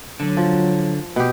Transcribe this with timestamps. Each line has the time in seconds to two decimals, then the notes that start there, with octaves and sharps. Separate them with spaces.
0.20 D3 F#3
0.37 F3
1.16 B2 G4